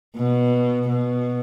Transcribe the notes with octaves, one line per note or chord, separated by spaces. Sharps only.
B2
B2